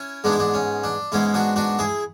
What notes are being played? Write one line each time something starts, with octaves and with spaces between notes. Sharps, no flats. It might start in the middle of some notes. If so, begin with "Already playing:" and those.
Already playing: C#4 E4
G#2 G#3 B3 D4
E4
D4
C#4
D4
G#2 G#3 B3 C#4 E4
D4 F#4
D4 F#4
E4 G#4